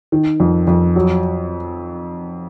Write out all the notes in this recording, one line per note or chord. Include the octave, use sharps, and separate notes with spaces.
D#3
F2
F2
F#3